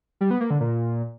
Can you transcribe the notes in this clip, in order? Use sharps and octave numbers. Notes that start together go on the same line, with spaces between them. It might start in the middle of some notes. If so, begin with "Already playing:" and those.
G3
B3
A#3
D3
A#2